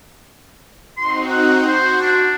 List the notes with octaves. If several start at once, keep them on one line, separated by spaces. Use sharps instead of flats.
C4 D#4 F#4 C6
F#5
F#4 C5
D4